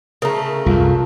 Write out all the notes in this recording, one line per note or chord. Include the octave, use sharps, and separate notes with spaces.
C#3 A3 A#4 A#5
C2 F#2 F4